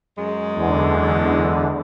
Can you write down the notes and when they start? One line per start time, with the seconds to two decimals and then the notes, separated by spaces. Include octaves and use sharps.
0.17 F#2 G#3
0.54 E2 D3